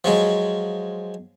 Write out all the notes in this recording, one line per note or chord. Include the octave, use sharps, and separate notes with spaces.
F3 F#3 G#3